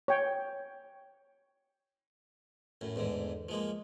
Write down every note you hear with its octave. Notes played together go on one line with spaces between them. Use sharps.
C#5 G5
F#2 A2
E2 G#2 D3
F3 G#3 A#3